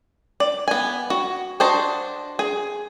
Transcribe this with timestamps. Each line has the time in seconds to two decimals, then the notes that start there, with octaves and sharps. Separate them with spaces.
0.40 D5
0.68 B3 G#5
1.10 F#4
1.60 D4 F#4 C5 D#5 A5
2.39 G#4